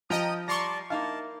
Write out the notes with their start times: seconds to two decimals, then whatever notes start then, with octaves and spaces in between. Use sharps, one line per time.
0.10 F3 D#5 G5 A#5 D#6
0.48 G3 D5 A5 A#5 C6 C#6
0.90 A#3 D#4 E4 F5 A5